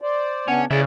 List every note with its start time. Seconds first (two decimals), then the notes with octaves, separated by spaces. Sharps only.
0.01 C5 D5
0.48 C#3 B3 C#4 D4 F#5
0.71 C#3 E3 G#4 D5 E5